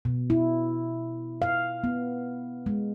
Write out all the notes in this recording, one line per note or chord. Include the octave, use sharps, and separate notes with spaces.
B2
E4
F5
B3
G#3